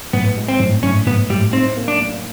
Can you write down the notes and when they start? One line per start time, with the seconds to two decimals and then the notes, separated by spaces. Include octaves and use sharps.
0.13 A2 B3
0.36 G#3
0.48 C4
0.60 A2
0.83 A2 C#4
1.06 A2 B3
1.30 A2 G3
1.53 C4 D#4
1.76 A#3
1.88 D4
2.00 A#3